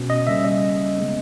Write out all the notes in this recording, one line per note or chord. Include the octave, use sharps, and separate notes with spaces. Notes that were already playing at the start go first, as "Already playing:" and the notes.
Already playing: B2 C#4
D#5
C#3 G3 A#3 C#4 E5
D#5
C#3 G#3 B3